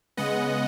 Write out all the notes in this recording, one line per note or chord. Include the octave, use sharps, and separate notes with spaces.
C#3 G#3 B3 D#5 F#5